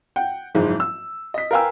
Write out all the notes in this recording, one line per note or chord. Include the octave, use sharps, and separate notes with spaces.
F#5 G5
F#1 G#2 F3 G#3
E6
D#5 B6
A#4 B4 F5 G5 G#5 E6